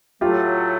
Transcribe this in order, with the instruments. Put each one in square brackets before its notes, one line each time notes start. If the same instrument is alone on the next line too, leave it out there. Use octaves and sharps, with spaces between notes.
[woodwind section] A2 F#3 A3 [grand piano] F4 G4